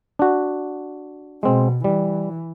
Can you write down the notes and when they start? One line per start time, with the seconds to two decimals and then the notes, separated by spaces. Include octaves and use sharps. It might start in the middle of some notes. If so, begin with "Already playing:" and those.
0.19 D4 F#4
1.43 B2 G#3 C4
1.84 E3 G3